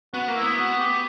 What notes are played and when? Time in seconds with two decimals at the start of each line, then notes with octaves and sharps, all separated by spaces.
0.14 B3 F#4
0.28 A#3
0.36 E4
0.42 B3
0.58 F#4
0.79 G4